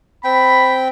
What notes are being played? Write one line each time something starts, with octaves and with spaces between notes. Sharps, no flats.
C4 G5 B5